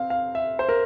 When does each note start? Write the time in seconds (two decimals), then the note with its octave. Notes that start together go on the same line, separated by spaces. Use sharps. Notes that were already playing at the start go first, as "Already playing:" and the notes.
Already playing: C4 F5
0.10 F5
0.35 E5
0.59 C5
0.69 A#4